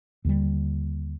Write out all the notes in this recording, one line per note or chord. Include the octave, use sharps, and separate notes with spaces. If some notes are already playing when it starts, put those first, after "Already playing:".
D#2 D3 G3